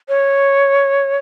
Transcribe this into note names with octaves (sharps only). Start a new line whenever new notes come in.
C#5